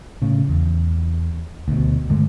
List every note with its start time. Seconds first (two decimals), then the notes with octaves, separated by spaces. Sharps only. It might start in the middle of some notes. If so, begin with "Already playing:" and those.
0.22 A2 C#3
0.49 E2
1.68 D2 B2
2.09 G2 D3 G#3 A3